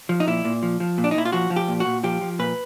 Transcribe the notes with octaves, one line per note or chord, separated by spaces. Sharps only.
F3
D#4
A#2 E4
A#2
F3
F3
A#2
D4
D#4
A#2 E4
F4
F3 F#4
F3
G4
A#2
F#4
A#2
F3 G4
F3
A#2 B4